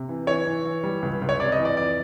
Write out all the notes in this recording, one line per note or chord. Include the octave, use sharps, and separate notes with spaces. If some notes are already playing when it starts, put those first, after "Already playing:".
Already playing: C3
E3
E3 C#5
E3
E3
G3
C#2
C#2
C#5
C3 D5
D#5
E3
D5
F2 D5